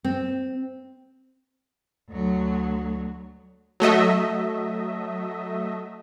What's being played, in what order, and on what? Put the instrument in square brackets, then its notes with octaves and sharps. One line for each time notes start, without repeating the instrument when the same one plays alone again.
[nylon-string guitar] C4
[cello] D2 F#3
[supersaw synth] F#3 A3 D#5 E5